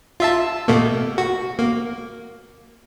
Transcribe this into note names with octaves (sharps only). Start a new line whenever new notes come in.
F4 E5 A5
B2 A3 A#3
F#4
A#3